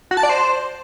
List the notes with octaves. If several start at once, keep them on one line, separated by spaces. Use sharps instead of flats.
F#4
A5
D5
C5